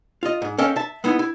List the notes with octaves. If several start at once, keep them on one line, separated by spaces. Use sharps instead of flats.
F4 D#5
G#2
C#4 A4 D#5 F5 G5
E5 A5
G#3 B3 D#4 E4
E4